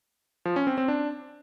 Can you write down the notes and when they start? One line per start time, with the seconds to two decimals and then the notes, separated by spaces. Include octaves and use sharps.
0.45 F3
0.56 C#4
0.67 C4
0.78 C4
0.88 D4